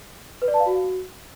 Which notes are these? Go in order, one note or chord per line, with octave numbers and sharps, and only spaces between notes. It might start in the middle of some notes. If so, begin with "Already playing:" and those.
B4
D5
A5
F5
F#4